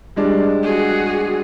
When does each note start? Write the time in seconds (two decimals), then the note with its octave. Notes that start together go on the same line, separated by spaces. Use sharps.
0.16 G3 G#3 D4
0.63 F#4 G#4